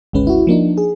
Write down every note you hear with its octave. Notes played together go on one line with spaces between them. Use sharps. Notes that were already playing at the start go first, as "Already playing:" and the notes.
G#1 D2 G#3 C#4 B4
E4 F#4
F3 A#3 D4 D#4
G#4